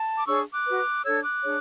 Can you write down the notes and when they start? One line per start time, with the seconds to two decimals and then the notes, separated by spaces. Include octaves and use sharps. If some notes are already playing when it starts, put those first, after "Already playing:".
Already playing: A5
0.17 D6
0.27 D4 G#4 C#5 C#6 E6
0.52 D6 F#6
0.66 F#4 B4
1.04 D4 A4 C#5 E6 G#6
1.23 D6 F#6
1.42 D4 G#4 C#5